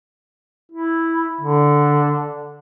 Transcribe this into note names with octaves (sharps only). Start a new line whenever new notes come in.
E4
D3